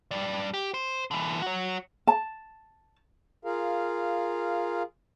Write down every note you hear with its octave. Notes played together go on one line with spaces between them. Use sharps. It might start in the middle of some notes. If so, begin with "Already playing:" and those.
G2 D5
G4
C5
D3 E3
F#4 C#5
A5
F4 G#4 A#4 F5